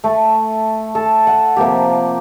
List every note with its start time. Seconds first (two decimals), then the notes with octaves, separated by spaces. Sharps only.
0.04 A3
0.95 A4
1.27 F#5
1.56 C3 F3 A#3 G4